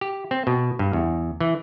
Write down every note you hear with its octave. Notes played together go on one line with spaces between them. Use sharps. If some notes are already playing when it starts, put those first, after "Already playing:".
G4
C4
B2
G2
E2
E3